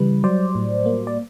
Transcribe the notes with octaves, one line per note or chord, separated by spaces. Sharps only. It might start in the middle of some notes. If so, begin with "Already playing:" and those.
Already playing: C#3 E3 G3 B4
F#3 C5 D5
A2
A#3
D5